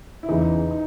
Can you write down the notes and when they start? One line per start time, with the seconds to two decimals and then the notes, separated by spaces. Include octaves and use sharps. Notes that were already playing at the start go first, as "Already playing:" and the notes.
0.23 E4
0.29 E2 C#3 E3 D#4
0.71 D#4